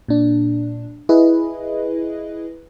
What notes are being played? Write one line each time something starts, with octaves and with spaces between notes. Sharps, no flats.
A#2 D4
E4 G#4 B4 D#5